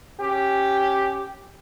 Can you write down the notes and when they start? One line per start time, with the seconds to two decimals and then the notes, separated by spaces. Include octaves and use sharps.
0.20 C#4 G4